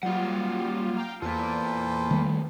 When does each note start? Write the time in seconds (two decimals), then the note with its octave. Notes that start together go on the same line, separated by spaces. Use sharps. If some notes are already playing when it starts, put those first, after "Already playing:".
0.03 F#3 G3 A#3 F4 F#5
0.97 F5 G5 A#5
1.22 E2 A#3 F4 A4 B4 C5
2.11 D#3 G3 A3